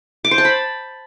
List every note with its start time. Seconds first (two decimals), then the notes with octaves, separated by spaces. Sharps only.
0.25 D6
0.31 C5
0.38 A5
0.45 B5